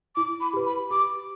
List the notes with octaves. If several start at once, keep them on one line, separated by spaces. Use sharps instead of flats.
E4 D6
B5
G4 B4
B5
G4 D6